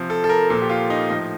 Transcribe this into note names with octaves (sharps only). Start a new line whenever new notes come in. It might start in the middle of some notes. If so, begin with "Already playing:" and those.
Already playing: C3 F3
A4
A4
A#4
A#2 F3 A4
G4
F4
D#4
A2 F3 D#4